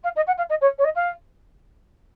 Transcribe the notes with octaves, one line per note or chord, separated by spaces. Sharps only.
F5
D#5
F#5
F5
D#5
C#5
C#5
D#5
F5